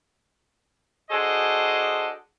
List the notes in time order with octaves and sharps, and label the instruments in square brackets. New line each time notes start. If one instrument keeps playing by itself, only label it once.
[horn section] D4 F#4 G#4 A4 C5 D#5